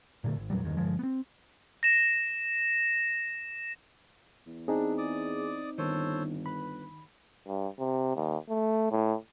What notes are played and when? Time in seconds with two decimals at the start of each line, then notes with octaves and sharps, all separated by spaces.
0.24 A#2 D3 A3
0.36 G#1
0.50 E2 A#2 F#3 G3
0.63 E2 G2 D#3
0.77 G2 D3 F3 G#3
0.99 B3 C4
1.83 A#6 E7
4.47 E2
4.68 C4 D4 D#4 G#4
4.98 D5 D6 D#6
5.78 G1 D#3 A4 C5 C#5
6.46 B4 B5
7.48 G2
7.79 C3
8.16 D#2
8.49 A3
8.91 A2